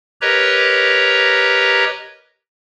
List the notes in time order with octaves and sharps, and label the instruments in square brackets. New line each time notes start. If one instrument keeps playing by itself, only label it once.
[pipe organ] G4 A#4 B4 C#5 D#5 A#5